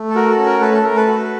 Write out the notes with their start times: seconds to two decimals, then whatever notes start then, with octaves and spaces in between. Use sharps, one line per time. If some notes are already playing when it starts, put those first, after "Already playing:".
Already playing: A3
0.10 A4
0.15 F#4 A#4
0.30 A4
0.38 C#4
0.46 A#4
0.60 A3 A4 B4
0.73 A4
0.84 A3 A#4
0.96 A4 B4
1.07 F#4